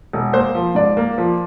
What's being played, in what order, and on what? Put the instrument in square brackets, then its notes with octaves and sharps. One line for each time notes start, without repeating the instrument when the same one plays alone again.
[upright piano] E1
A#3 C5
F3
G#2 D5
A#3
F3